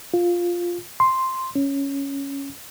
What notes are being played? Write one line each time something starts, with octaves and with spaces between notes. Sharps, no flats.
F4
C6
C#4